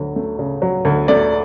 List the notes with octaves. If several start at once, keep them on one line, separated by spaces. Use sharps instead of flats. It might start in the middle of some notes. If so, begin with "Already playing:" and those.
Already playing: D2 F#3
A3
C#3
F#3
D2
A3 D5